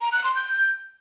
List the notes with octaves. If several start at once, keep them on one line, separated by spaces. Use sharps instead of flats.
A#5
F#6
C6
G6